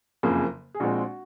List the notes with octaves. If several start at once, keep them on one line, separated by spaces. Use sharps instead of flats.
F#1 F2 C#3 F3 A#3 G#4
G#4
A#1 A#2 G#3 C4 F#4